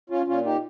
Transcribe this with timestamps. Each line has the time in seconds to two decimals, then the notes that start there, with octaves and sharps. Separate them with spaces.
0.10 C#4 F4
0.27 A#2 C#4 F4
0.45 D#4 G4